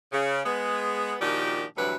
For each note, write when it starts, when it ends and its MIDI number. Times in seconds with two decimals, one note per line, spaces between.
0.12 0.40 49
0.45 1.14 56
0.45 1.14 59
1.21 1.64 46
1.21 1.64 51
1.21 1.64 53
1.21 1.64 62
1.21 1.64 66
1.21 1.64 67
1.77 1.96 38
1.77 1.96 43
1.77 1.96 48
1.77 1.96 52
1.77 1.96 54
1.77 1.96 71